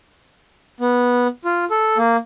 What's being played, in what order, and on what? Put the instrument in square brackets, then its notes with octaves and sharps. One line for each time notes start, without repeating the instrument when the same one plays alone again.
[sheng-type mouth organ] B3
F4
A4
A#3